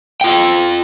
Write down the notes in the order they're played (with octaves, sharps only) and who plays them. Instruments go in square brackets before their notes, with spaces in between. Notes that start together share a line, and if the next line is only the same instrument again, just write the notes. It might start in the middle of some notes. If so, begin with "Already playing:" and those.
[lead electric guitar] F4 G5